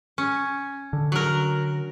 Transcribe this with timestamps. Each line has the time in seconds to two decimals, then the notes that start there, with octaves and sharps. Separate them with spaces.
0.18 C#4
0.93 D3
1.12 F#3 A#4